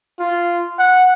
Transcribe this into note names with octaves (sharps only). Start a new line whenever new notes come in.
F4
F#5